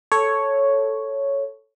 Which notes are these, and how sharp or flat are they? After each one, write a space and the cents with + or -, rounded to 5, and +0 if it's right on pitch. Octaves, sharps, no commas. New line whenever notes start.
A4 +0 C#5 +0